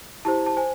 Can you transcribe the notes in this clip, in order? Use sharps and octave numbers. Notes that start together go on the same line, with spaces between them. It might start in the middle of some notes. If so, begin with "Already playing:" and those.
E4 G4 C5 A5
A5
C5 G#5